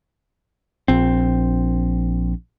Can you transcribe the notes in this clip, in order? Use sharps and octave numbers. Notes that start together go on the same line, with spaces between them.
A#1 C4